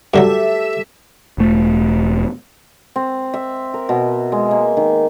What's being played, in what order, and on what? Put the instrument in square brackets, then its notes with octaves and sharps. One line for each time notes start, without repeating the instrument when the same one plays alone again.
[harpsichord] G2 D3 F#3 [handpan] G4 A4 [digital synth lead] E5
[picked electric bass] E1 A3
[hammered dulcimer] C4
E5
A#4
B2
G#3
A#3
D#3